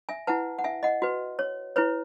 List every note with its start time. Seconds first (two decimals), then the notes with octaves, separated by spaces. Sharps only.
0.09 E5 G#5
0.27 E4 B4 F#5 A5
0.59 F#5
0.64 E5 G#5
0.83 D#5 F#5
1.02 F#4 B4
1.39 C#5
1.76 E4 B4 C#5